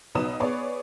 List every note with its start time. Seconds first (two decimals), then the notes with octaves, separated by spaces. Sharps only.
0.15 B1 B2 D#4 B4 D#6 E7
0.40 B3 G#4 B4 C#5 D5